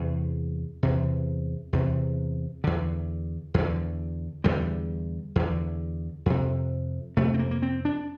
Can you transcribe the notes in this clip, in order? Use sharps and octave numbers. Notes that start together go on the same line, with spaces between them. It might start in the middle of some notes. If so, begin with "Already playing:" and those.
Already playing: E2 C3
E2 C3
E2 C3
E2 D3
E2 D3
E2 D3 G3
E2 D3
F2 C3
F2 C3 A3
C4
A#3
A#3
C4
D4